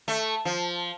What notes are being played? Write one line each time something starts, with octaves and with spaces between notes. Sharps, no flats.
A3
F3